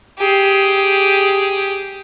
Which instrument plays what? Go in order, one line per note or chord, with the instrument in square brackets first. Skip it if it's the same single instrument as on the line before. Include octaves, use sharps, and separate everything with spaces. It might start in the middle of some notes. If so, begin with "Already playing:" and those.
[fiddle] G4 G#4